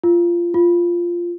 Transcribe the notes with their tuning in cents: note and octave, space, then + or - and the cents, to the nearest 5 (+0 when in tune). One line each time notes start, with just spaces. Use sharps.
F4 -15
F4 -5